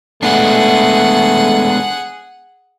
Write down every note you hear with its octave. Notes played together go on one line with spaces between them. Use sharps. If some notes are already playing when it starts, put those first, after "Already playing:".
G#3 A3 B3 D4 G#4 F#5